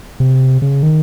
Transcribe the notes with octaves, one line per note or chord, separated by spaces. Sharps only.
C3
C#3
D#3